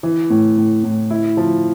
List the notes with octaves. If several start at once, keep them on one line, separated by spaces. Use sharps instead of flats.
E3
A2
A2
A2
E4
F3